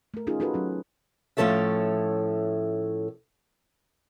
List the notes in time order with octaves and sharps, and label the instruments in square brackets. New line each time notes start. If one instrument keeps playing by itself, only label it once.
[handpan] A3 A#4
C#4 D#4 F4 G#4
D#4 F4 F#4 A4 B4
F#3 C#4
[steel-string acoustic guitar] A2 F3 C#4 A4 C#5 E5